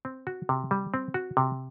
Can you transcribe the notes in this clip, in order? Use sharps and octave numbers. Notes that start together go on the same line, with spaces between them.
C4
F#4
C3
G3
C4
F#4
C3